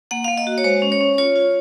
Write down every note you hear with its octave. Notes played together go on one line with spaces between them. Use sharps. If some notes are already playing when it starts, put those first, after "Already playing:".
A#3 F#5
A#3 F5
D#5
F#4
C#5
G#3 C5
C#4
C#5
C#4
F4 C#5
F4